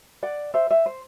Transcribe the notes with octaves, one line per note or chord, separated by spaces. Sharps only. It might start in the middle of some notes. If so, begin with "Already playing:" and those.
D5 F#5
C5 E5
C5 E5
C5